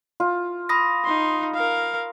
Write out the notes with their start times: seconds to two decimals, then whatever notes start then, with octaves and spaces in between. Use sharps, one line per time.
0.20 F4
0.69 B5 D#6 A#6
1.05 D#4 C6
1.53 A#4 F5